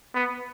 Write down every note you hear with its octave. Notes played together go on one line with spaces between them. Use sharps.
B3